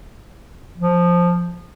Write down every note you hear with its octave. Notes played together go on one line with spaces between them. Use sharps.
F3